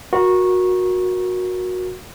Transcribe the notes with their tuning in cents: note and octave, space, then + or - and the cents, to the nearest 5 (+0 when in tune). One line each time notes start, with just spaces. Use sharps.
F#4 -15 A#4 +25